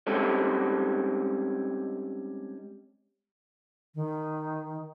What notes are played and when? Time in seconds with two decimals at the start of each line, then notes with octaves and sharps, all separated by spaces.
0.07 G3 G#3 C4 C#4 D#4 A4
3.95 D#3